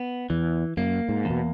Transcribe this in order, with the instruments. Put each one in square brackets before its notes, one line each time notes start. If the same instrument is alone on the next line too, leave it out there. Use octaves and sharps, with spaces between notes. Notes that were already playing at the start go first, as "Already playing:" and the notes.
Already playing: [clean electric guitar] B3
[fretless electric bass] E2 [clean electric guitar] E3
[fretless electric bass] F#2 [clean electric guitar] A#3
[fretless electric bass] G#2
[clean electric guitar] E2
[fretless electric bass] B2